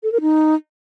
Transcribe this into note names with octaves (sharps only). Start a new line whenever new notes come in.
A4
A#4
D#4